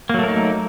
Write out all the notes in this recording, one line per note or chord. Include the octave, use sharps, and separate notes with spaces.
F#3 A3 A#3 D#4 A#4